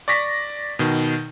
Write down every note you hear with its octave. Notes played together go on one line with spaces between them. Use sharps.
D5 C#6 A#6 B6
B2 D#3